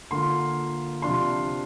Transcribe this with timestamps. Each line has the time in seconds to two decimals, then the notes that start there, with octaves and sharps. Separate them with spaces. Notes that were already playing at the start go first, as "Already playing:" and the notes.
0.11 D3 A#3 F4 C6
1.02 C3 F3 D4 F4 C6